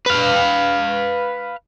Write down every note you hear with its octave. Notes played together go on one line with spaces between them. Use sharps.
B4 F5